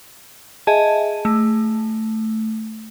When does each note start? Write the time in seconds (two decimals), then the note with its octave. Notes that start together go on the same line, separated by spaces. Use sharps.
0.67 G#4 D#5 E5 G#5 A5
1.25 A3